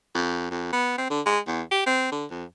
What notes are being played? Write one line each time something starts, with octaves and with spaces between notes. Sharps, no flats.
F2
F2
B3
C4
D3
G#3
E2
G4
C4
D3
F2